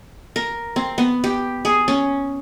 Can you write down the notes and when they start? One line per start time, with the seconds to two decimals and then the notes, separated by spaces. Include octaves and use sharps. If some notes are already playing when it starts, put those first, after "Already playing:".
0.36 A#4
0.76 C4
0.98 B3
1.24 G4
1.65 G#4
1.88 C#4